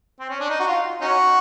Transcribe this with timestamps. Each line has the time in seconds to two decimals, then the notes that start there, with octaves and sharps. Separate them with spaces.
0.20 C4
0.30 C#4
0.40 D4
0.49 D#4
0.60 F#4
0.67 F4
1.01 C#4 D#4 F#4